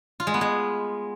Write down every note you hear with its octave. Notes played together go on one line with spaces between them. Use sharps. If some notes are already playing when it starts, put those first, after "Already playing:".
F4
G#3
B3
G#3